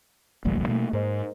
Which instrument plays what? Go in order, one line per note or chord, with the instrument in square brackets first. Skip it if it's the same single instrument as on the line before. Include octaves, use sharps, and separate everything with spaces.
[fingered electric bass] E1 A1 D2 [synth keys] F3 G3 A#3
[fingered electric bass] B2 A3 [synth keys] A#3
[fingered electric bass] G#2 [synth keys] A#4 C5 D#5